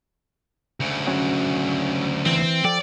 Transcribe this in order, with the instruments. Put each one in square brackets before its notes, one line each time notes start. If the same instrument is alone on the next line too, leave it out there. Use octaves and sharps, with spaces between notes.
[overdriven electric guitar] D2 C#3
[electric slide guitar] F#3 C#4
[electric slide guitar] E3 [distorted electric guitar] C4
[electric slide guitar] F3 A4 G5 [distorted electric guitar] D5